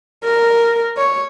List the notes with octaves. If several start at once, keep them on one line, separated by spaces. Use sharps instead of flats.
A#4
C#5